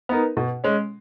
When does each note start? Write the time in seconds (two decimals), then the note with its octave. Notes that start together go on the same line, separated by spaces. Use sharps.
0.09 B3 D#4 A#4
0.37 B2
0.64 G#3 C#4